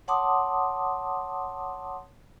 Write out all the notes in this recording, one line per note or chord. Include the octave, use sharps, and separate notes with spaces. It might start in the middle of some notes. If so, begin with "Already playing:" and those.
C#5 F#5 A5 C6 D6 D#6